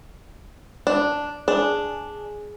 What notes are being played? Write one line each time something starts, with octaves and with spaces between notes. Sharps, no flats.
D4
D4 G#4